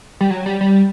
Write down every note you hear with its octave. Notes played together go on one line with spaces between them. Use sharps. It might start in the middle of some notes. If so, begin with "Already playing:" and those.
G3
F#3
G3
G3